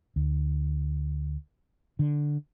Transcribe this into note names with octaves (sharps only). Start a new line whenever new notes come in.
D2
D3